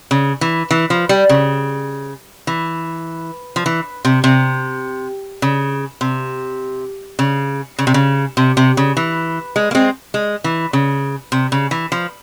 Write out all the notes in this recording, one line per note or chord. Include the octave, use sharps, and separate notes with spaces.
C#3
E3
E3
F3
G3
C#3
E3
F3
E3
C3
C3
C#3
C3
C#3
C#3
C3
C#3
C3
C3
C#3
E3
G#3
A#3
G#3 C4
G#3
E3
C#3
C3
C#3
E3
F3